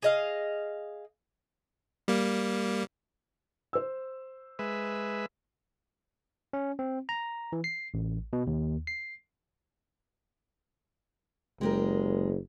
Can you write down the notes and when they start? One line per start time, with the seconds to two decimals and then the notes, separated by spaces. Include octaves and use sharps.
0.02 G#4 D#5 F5
2.08 G3 A#3
3.73 C5 E6
4.59 G#3 B4 E5
6.53 C#4
6.79 C4
7.09 A#5
7.52 E3
7.64 C7
7.94 A1
8.33 B2
8.47 D#2
8.87 C7
11.61 F#1 G#3 G4 A#4